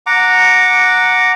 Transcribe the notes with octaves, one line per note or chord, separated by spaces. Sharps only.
F#5 A#5 D6